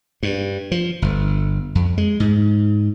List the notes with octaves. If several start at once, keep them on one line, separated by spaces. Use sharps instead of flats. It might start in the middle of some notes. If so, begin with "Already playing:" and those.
G2
F3
G1
F2
G#3
G#2